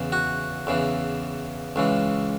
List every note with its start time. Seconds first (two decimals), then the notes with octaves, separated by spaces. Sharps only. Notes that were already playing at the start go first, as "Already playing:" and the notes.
Already playing: E2 C#3 E3
0.12 F#4
0.67 E2 C#3 E3
1.76 C#2 C#3 E3